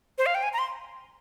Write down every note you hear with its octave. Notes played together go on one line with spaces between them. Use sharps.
C5
F5
G5
G#5
A#5
C6